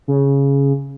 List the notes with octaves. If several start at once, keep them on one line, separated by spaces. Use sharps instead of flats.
C#3